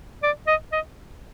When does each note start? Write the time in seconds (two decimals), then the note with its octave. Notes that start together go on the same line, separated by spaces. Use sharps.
0.23 D5
0.47 D#5
0.72 D#5